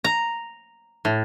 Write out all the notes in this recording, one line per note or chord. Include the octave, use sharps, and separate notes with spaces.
A#5
A2